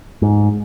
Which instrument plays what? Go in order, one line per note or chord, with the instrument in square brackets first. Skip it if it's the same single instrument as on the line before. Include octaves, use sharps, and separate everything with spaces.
[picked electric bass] G#2